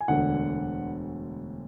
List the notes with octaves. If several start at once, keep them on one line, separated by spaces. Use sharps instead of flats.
G#5
E1 D2 D3 F#5